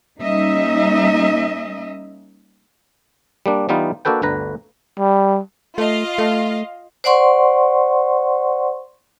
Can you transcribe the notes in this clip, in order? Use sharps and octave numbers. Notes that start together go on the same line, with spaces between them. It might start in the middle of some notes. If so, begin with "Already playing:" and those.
G3 A#3 C#4 D#4 D#5 E5
G3 A#3 D4
E3 G3 B3 D#4 F4
A#3 D4 F#4 A4 B4 G5
G1 D2 D3 B4 A#5
G3
A3 F4 D#5 F5
A3
C5 D5 F#5 C6 C#6